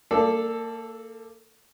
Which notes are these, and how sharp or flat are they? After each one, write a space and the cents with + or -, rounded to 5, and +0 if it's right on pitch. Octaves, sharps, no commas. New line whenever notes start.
A#3 -30 A4 +0 D5 +0